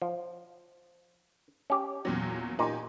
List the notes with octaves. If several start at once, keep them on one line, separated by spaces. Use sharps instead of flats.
F3
C#4 G4
E2 A#2 F#3
A#2 D#4 G4 G#5